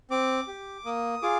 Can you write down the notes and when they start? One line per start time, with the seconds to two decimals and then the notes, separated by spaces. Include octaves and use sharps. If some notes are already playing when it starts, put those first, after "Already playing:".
0.11 C4 D6
0.47 G4
0.85 A#3 D#6
1.22 F4 G#4 D6